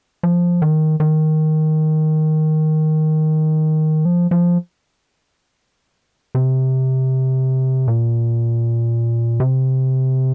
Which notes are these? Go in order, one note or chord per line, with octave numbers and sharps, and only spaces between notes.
F3
D#3
D#3
F3
F3
C3
A#2
C3